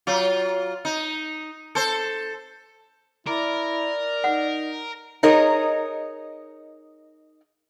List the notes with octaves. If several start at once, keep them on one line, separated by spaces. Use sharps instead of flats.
F#3 F4
D#4
A4 C5
E4 A#4 D5
D#4 F#5
D#4 G#4 A#4 C#5 D#5